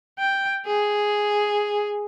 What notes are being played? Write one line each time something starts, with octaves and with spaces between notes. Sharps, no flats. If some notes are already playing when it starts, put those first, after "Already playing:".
G5
G#4